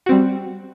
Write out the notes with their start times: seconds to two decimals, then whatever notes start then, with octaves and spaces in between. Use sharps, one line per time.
0.06 F#4
0.09 C4
0.12 G3